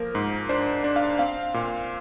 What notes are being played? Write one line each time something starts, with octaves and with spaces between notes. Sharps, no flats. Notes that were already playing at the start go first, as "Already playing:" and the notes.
Already playing: F3 A#3 A#4
G#2
D4 C5
D4
F5
C4 F5
A#2